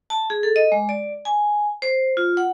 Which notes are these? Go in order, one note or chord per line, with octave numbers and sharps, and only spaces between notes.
A5
G#4
A4
D#5
G#3
D5
G#5
C5
F4
F#5